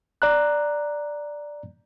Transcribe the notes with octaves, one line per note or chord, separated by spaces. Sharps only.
D5 A#5 F#6